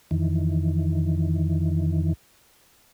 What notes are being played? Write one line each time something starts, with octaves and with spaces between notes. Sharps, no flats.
F2 D#3 E3